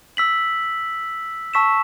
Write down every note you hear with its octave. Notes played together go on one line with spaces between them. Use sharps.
E6 B6 F#7
A5 C#6 E6 B6 E7